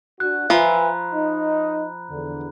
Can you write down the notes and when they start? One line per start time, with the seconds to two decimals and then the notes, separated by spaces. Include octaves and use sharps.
0.20 D4 F#4 F#6
0.50 F3 B4 E5 G#5 A#5 B5
1.13 D#4 D#5
2.10 E2 D3